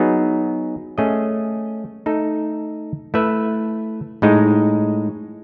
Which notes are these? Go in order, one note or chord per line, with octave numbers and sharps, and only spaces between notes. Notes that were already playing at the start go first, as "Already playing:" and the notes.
Already playing: F#3 B3 D#4 G#4
A3 C#4 G#4 D#5
A3 D#4 A4
A3 E4 B4 E5
A2 G#3 D#4